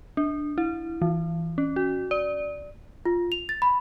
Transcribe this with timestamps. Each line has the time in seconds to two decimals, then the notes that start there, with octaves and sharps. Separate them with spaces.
0.17 D4
0.58 E4
1.02 E3
1.58 C#4
1.76 F#4
2.11 D5
3.05 F4
3.32 F7
3.49 A6
3.62 B5